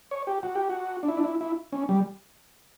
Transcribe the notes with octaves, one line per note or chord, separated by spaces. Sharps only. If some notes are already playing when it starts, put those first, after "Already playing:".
C#5
G4
F#4
G4
F#4
D4
E4
D4
E4
E4
C#4
G3